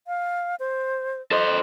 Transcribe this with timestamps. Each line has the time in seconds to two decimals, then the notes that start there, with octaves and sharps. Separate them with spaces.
0.07 F5
0.60 C5
1.31 A4 C5 D#5